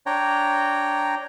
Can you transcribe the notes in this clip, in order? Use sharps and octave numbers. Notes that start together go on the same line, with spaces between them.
D4 C#5 G5 A#5